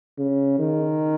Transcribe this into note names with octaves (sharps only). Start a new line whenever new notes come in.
C#3
D#3